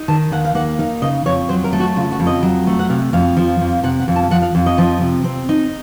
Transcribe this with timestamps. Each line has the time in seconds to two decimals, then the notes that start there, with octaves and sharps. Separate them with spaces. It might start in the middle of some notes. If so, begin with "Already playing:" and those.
Already playing: D#4
0.08 D#3 A5
0.32 D#2 F#5
0.45 F5
0.55 A#3 F#5
0.79 D#4 F5
1.02 C#3 D#5
1.26 F2 C#5
1.49 F#3 C5
1.64 A#4
1.73 A3
1.80 F#4
1.96 C#3 F4
2.12 F#4
2.20 F2
2.27 D#5
2.43 F#3
2.67 A3
2.79 F#5
2.90 C3 F5
3.13 F2 F5
3.37 F3
3.61 F2
3.83 C3 F#5
4.00 F#5
4.08 F2
4.16 A5
4.23 F5
4.31 F3 F#5
4.42 F5
4.55 F2
4.66 D#5
4.78 F3
5.01 C3
5.24 C4
5.49 D#4